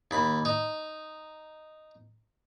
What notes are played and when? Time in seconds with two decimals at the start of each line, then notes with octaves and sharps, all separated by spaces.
0.11 D#2 B5
0.45 D#4